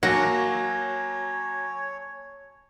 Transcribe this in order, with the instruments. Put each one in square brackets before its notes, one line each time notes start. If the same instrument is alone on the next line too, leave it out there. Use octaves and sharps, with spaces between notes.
[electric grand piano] F#3 A#3 A#6 [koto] F#4 [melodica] C#5 [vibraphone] G#5 A5